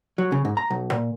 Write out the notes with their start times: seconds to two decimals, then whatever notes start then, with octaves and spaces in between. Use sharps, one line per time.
0.18 F#3
0.32 C#3
0.45 G#2
0.57 A#5
0.70 B1
0.92 A#2